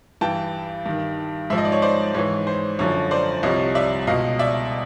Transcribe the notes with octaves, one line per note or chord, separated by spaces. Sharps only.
G2 E3 G5 A5
G2 D#3
G#2 F3 E5
D#5
D5
C#5 D#5
C5 D5
G#2 E3 C#5
C5
F#2 D3 F3 C#5
C5 D5
C2 C3 F3 C#5 D#5
D5 E5
C#2 B2 D#5 F5
D5 E5